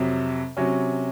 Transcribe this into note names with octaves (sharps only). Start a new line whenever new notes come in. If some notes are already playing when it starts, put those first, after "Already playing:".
Already playing: F2 C3 F#3
C3 F#3 C#4